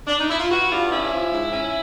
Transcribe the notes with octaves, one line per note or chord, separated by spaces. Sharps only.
D4
D#4
E4
F4
E3 F#4
G2 F4
C#4 E4
F3
G#2
C#4